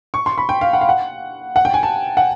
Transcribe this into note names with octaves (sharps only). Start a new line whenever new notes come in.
C#6
C6
B5
G5
F5
F#5
F5
F#5
F#5
G5
G#5
A5
F#5